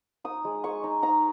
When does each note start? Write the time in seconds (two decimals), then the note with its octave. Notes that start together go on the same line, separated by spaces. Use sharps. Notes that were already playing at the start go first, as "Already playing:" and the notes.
0.24 D#4 D#6
0.45 G#3
0.64 G#3 C#6
0.84 D#4
1.03 D#4 A#5